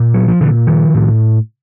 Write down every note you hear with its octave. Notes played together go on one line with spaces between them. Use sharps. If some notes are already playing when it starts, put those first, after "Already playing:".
Already playing: A#2
F#3
F3
A#2 D3 E3
D#3 F3
A2